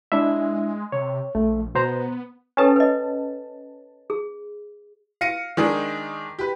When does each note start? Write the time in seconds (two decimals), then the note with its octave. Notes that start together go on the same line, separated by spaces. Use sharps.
0.12 G#3 D4 E4 E5
0.92 C3 C#5
1.35 A#1 A3
1.75 B2 B3 C5 A#5
2.57 C#4 A4 B4 G5 A5
2.76 B4 D#5
4.10 G#4
5.21 F5 A#6 C#7 D#7
5.57 D#3 G#3 D4 D#4 G#4 D5
6.39 G4 B4